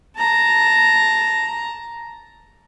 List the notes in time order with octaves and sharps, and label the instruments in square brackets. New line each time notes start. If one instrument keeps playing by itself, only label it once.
[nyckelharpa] A5 A#5